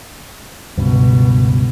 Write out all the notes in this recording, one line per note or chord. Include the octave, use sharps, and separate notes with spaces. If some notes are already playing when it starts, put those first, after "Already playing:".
C#2 G2 B2